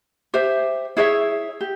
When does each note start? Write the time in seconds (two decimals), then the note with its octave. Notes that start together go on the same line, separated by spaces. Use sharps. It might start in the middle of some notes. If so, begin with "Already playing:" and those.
0.34 G4 C5 E5
0.97 E4 G#4 C#5 E5
1.61 G4